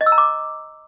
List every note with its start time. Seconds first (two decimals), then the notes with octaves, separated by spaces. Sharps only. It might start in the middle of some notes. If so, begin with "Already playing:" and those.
0.01 D#5
0.06 E6
0.12 A#5
0.18 D6